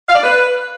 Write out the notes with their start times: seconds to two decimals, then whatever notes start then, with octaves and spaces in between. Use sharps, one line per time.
0.08 F5
0.15 D5
0.23 B4